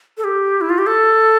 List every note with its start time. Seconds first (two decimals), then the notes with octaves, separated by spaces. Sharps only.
0.17 A4
0.24 G4
0.61 E4
0.70 F4
0.78 G4
0.87 A4